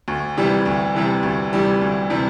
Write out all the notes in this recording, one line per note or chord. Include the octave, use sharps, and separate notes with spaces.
D2
C3 E3 G3
D2
C3 E3 G3
D2
C3 E3 G3
D2
C3 E3 G3